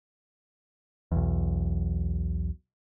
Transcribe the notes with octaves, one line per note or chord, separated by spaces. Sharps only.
B1 E2